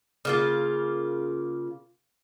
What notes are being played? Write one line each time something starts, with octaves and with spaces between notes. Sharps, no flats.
C#3 A#3 F4